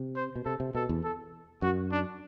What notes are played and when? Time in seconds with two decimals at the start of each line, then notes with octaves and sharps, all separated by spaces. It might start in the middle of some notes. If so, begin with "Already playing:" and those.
Already playing: C3
0.16 C5
0.36 B2
0.45 C3 A4
0.60 C3
0.75 B2 A4
0.89 E2
1.04 A4
1.62 F#2 F#4
1.91 D4